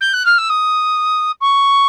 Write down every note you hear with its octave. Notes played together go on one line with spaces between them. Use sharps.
G6
F#6
F6
E6
D#6
C#6